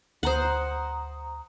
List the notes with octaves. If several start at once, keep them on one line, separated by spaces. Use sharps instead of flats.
D2 C5 F#5 A#5 D#6